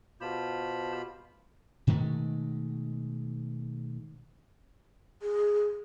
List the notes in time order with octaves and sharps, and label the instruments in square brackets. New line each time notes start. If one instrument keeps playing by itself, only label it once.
[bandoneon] B2 F4 B5 [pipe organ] G4 C5 A5
[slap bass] B2 D#3 G#3 A3
[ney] G#4